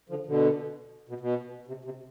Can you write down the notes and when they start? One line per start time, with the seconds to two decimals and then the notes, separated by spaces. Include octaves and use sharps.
0.09 D3 F3
0.27 B2 D3
1.09 B2
1.20 B2
1.68 C3
1.85 C3